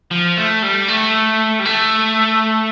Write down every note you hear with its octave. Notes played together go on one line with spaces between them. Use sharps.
F3
A3
G3
A3
G3
A3